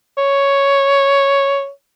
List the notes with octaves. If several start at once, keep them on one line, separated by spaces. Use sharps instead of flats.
C#5